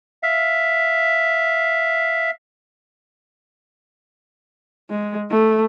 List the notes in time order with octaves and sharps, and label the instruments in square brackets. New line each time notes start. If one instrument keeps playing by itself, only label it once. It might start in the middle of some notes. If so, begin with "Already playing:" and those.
[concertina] E5 F5
[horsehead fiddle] G#3
A3